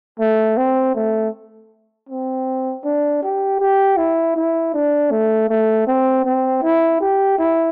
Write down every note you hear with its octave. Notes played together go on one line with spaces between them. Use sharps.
A3
C4
A3
C4
D4
G4
G4
E4
E4
D4
A3
A3
C4
C4
E4
G4
E4